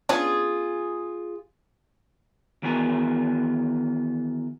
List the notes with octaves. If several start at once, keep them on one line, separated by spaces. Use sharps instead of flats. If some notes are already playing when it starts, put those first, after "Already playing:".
B3 C#4 D4 F4 G#4
D#3 E3 B3 F#4 G#4 A#4